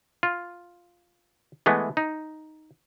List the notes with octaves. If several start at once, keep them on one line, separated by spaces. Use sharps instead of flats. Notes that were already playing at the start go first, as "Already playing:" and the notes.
F4
E3 G#3 A3 B3
D#4